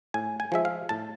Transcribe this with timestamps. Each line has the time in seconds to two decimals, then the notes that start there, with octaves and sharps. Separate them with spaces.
0.14 A2 G#5
0.40 G#5
0.52 F3 G#3 E5
0.65 F5
0.89 A2 A5